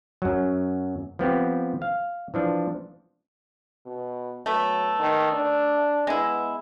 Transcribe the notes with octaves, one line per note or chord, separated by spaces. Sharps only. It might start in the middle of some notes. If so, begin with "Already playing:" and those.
F#2 F#3
F3 B3 C4 G4
F5
E3 F3 D4
B2
F#3 A3 B3
D#3
D4
G#3 B3 E4